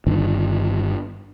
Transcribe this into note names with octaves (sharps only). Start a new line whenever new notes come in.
G1 G2 D3 D#3